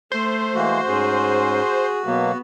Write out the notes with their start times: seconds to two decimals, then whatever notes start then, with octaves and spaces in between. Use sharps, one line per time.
0.12 A3 C5
0.55 E3 G#3 A#3 F#4
0.87 G#2 C#4 G#4
2.05 B2 F#3 A#3 B3